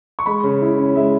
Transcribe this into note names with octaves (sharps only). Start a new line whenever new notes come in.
C#6
G#3 B5
C#3
E4
C#4
G#3 E5